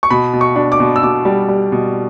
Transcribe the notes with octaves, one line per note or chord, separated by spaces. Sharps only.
C#6
B2 B5
B2
C#6
D4
D6
B2
E6
B2 D6
G3
G3
B2